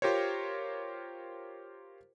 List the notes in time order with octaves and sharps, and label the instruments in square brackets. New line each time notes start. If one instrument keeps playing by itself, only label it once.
[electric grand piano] F4 G4 A#4 C5 C#5